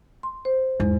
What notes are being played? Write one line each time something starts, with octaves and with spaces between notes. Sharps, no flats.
C6
C5
E2 G#2